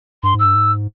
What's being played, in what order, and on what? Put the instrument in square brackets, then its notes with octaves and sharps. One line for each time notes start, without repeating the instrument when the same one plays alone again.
[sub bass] G2 [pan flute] C6
[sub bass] G#2
[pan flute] E6
[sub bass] G2
G#2